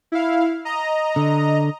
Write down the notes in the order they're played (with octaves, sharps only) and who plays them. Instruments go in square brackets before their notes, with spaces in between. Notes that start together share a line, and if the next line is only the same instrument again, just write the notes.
[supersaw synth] E4 F5
D#5 A#5
[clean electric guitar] D3